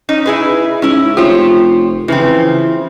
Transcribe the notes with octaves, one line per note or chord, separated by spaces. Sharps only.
C#4 D#4
E4 G#4 B4
G#2 C#4 E4
F1 F4 G4 C5 C#5
C#3 E3 F3 C4